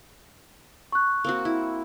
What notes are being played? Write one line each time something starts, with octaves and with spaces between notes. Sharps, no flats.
C#6 F#6
A#3 C4 F#4
E4